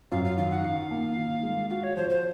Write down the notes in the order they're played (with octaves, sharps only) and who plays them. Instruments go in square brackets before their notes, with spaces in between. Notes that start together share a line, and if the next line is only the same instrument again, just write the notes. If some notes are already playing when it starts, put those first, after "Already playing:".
[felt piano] F#2 [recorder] F5
[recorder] F5
[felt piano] D#3 [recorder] F5
[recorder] F#5
[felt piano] D#3 [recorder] F5
[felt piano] A#3
D#3
G#3
[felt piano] F#4 [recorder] F5
[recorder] C#5
[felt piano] F3 [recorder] C5
[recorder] C5